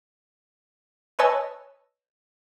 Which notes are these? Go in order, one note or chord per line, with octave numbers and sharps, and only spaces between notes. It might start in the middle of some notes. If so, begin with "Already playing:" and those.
B4 C#5 D#5 G#5 A5 E6